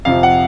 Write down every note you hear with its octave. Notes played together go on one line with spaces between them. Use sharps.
F2 C3 F3 F5
F#5